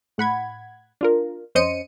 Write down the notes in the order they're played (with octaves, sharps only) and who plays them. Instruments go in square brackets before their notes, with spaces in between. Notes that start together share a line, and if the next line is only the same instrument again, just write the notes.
[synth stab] A2 F#5 B5 G#6
D4 F4 A#4
F2 C#4 C5 D#5 C#7 D#7